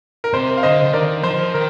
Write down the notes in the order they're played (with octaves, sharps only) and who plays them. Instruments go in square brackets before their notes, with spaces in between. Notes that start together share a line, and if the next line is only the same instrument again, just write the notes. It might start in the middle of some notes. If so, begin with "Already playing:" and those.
[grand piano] A#4
[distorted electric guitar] C3 [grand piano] C5
[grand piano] F5
[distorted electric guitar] D3 [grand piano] C5 D#5
[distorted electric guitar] D3
[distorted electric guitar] D#3 [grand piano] A#4 D5
[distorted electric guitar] F3 [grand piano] C5
[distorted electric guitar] D#3 [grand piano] A#4